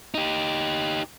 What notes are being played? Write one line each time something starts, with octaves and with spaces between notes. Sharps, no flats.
D#4 G4